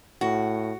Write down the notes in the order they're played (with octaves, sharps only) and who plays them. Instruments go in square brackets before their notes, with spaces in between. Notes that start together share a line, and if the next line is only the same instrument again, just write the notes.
[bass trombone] A2 [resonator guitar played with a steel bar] F#4